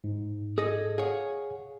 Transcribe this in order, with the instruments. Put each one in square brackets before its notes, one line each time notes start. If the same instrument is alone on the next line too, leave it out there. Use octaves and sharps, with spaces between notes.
[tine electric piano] G#2
[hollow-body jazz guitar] G#4 A4 D#5
[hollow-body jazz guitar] G#4 C#5 [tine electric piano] F5 F#5